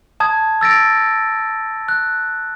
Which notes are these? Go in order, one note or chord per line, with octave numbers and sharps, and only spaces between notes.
A5 D#6 G#6
E6 A6 A#6 D7
F#6